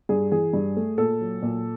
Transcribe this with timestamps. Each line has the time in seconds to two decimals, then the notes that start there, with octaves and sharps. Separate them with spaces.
0.09 G2 G#4
0.32 E3 G#4
0.53 G2
0.76 A3
0.98 A#2 A4
1.21 F#3
1.42 A#2